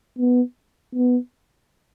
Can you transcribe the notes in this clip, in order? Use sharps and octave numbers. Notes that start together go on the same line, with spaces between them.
B3
B3